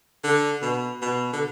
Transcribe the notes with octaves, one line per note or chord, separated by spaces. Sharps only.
D3
B2
B2
D3